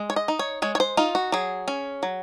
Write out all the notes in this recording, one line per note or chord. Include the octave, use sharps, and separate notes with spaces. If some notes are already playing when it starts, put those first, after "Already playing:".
Already playing: G#3
C#5
D#5
D#4
C#5
G#3 C#5
C#5
C5
D#4 F4
F#4
F#3 G#4
C#4
F#3